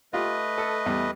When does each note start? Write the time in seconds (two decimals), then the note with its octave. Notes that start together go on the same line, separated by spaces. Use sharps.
0.13 A3 F4 G4 B4 D#5
0.58 A4
0.86 E2 G3